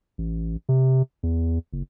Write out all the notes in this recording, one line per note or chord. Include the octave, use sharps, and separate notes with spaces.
A1
C3
E2
F#1